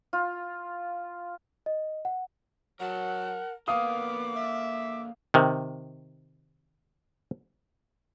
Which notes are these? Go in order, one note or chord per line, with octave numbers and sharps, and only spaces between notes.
F4
D#5
F#5
F#3 A#4 F#5 A5
D3 A#3 B3 F5 D6 D#6
E5
C3 D#3